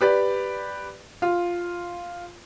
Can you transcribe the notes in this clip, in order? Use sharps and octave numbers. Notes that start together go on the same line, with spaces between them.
G4 B4 D5
F4